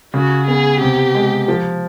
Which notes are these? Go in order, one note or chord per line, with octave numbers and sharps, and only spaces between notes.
C#3 F#4
B3 G#4
C3 G4
G#3
F3